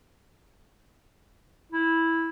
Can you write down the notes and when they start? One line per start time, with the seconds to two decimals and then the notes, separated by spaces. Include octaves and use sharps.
1.72 E4